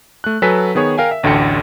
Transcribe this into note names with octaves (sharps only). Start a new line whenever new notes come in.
A3 F#6
F#3 A4 B4 G#5 B6
D#3 B3 G#4 C#5
A#4 F5 G5 G#5
E5
A1 D2 D3 G5 C#7